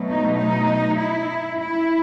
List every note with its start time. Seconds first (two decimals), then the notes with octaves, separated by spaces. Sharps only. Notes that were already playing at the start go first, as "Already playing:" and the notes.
Already playing: B2 F#3 A3
0.10 D#4
0.39 D#4
0.98 E4
1.57 E4